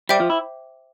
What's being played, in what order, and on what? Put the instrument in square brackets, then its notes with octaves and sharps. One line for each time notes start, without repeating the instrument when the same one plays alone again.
[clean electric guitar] G3 [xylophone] C5 E5 G5 D6
[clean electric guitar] F3
E4